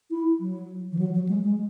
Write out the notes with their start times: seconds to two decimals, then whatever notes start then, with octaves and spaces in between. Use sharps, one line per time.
0.10 E4
0.40 F#3
0.92 E3
0.98 F#3
1.14 F#3
1.28 G#3
1.43 G#3